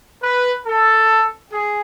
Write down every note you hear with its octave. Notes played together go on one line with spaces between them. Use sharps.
B4
A4
G#4